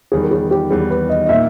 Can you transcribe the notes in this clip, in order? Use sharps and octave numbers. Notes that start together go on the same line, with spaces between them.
E2 D#3 G3 G#4
A#4
G#4
G4
E2 D#3 G3 G#4
B4
D#5
D#5
A#2 A#3 D#4 E5